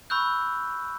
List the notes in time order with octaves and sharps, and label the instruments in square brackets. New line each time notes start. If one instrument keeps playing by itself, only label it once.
[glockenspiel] B5 C#6 E6 F#6 G6